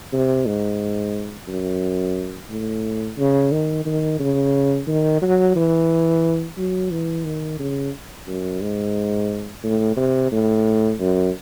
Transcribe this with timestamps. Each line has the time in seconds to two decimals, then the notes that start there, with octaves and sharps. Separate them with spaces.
0.13 C3
0.46 G#2
1.48 F#2
2.50 A2
3.18 C#3
3.52 D#3
3.86 D#3
4.20 C#3
4.87 D#3
5.22 F#3
5.56 E3
6.57 F#3
6.91 E3
7.25 D#3
7.59 C#3
8.27 F#2
8.61 G#2
9.63 A2
9.97 C3
10.32 A2
10.99 F#2